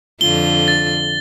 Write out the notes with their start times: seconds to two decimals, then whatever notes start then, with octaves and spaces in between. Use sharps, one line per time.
0.21 F2 D3 F4 G7
0.68 A6